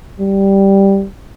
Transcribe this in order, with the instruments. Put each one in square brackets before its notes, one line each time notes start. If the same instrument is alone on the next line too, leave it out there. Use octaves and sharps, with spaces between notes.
[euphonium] G3